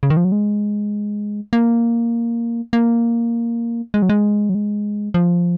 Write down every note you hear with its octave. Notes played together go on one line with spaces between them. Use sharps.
C#3
D#3
F3
F#3
G#3
A#3
A#3
G#3
F#3
G#3
F#3
G#3
F3